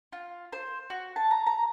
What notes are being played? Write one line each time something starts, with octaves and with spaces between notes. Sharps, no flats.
F4
C5
F#4
A5
A#5
A#5